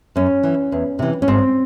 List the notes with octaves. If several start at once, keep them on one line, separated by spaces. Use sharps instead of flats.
F#2 C#4
E3
E2
C3 E3
C#4
G#2 C4